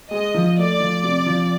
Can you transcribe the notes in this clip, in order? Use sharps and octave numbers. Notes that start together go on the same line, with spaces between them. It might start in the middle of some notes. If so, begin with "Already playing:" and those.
G#3 D#5
F3
A3 D5
F3
C3
F3